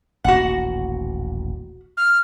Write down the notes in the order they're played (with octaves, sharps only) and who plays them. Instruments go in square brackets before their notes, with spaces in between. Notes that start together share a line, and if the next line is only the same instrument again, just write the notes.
[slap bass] D#1 A1 A#3 [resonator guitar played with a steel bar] F#4 F#5
[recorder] F6